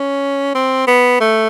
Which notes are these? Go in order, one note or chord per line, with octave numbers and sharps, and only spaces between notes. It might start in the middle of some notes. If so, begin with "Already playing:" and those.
Already playing: C#4
C4
B3
A3